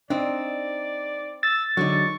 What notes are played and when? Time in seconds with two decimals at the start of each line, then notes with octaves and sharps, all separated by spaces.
0.10 C4 D4 D#4 D5
1.43 E6 A6
1.77 D3 F#3 G#3 D#4 C#6